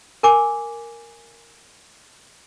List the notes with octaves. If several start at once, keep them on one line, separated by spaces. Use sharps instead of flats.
A#4 G#5 D6